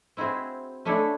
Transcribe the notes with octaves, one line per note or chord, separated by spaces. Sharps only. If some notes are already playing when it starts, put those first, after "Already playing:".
C4 E4 F#4 G#4 C5
A3 C#4 D4 E4 C#5